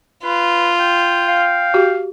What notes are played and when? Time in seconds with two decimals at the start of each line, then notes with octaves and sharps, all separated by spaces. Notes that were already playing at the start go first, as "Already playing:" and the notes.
0.24 F4 B4
0.80 G5
1.28 F5
1.74 F#4 G4